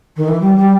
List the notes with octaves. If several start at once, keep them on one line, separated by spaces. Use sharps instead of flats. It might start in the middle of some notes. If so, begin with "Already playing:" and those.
D#3
E3
G3
G3